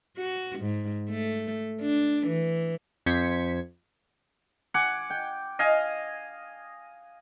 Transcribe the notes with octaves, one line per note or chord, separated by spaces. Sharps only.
F#4
G#2
A3
D4
E3
F2 C5 G#6 B6 C#7
F#5 G#5 D6
G5
D#5 F5 G#5